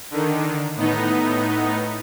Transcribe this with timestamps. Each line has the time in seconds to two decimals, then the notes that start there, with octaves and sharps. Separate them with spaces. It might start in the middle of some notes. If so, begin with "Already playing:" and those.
0.11 D3 D#3
0.76 A2 B3 D#4